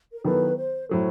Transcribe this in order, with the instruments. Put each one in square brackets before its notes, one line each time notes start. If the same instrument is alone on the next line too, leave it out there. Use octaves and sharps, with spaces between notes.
[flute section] A#4
[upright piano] D#3 F#3 B3 E4 A4 [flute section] B4
[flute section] C5
[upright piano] A2 F#3 A3 [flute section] C5